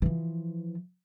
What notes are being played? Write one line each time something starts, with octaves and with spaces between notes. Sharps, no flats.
E3 F3